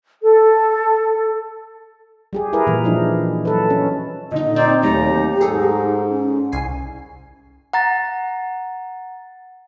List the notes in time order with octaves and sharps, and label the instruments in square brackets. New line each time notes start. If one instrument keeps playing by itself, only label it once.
[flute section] A4
[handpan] G3 G4 G#4
E4 G#4 A#4 B4
A#2 E3
F3 D4 D#4
F#3 A4 B4
C#4
[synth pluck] A#2 D3 D#4 [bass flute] D#5
[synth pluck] C4 [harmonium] D#4 C5 D5
[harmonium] D#2 A#5 [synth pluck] F#3 A3 [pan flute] D#4 [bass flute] G4
[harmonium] G#2 [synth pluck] G#4 A4
[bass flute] C#4
[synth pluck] C2 G#5 C7
[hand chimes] F#5 A#5 A6